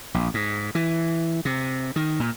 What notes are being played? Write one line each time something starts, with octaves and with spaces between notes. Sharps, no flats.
A#1
G#2
E3
C3
D#3
A#2